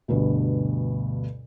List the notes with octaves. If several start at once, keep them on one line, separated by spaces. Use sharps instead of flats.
D2 G2 B2